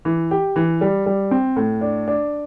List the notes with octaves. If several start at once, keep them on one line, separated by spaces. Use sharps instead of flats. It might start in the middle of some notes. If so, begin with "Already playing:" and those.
E3
G4
E3
G3
G3
C4
A2
D4
D4